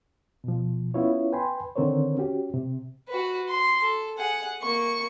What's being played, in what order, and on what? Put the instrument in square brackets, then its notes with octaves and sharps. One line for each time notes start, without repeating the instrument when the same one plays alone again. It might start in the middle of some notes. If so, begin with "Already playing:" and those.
[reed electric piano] B2 F3
B3 C#4 E4 F4 C#5
B4 G5 G#5 B5 C6
D3 D#3 C4 A#4 C5 C#5
C#4 F#4 G4
C3
[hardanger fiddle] F#4 B4
C6
A4
G#4 F#5
A#3 C#6